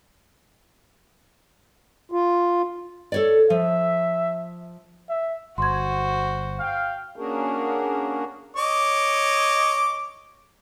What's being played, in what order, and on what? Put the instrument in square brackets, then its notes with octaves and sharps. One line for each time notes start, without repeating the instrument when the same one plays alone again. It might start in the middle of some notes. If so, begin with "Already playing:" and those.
[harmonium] F4
[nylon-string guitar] A4 C#5 D5
[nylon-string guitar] F3 [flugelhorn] E5
[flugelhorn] E5
[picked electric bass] G1 [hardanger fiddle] F#4 C5 [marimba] C6 G#6
[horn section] F5 G5
[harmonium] A#3 C#4 D4 F#4 G#4 A#4
[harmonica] C#5 D#5 D6